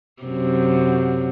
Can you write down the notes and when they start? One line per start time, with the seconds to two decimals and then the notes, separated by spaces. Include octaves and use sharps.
0.22 F#2 C3